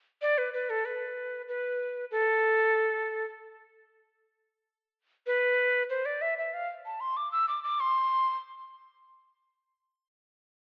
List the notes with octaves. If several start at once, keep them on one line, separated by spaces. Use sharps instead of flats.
D5
B4
B4
A4
B4
B4
A4
B4
C5
D5
E5
E5
F5
A5
C6
D6
E6
D6
D6
C6